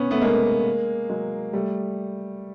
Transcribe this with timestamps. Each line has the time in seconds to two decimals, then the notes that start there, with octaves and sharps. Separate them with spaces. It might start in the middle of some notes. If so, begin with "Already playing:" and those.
Already playing: B3 C#4
0.11 A3 B3
0.22 G#3 A#3
1.09 F#3 G#3
1.53 G3 A3